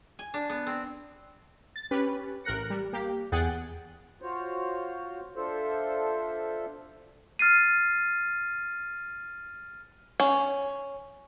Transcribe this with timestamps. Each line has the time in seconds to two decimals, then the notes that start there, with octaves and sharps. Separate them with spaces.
0.19 G#5
0.34 D4
0.50 B3
0.67 C4
1.76 A6
1.91 C#4 G4 B4
2.44 A1 A#4 F#6 A#6 C#7
2.70 G3
2.93 A#3 G4
3.32 E2 G#4 F#5 G5 A6
4.22 F4 F#4 C5 C#5
5.36 D4 F4 A4 C5 E5
7.39 F6 A6 C7 D#7
10.20 C#4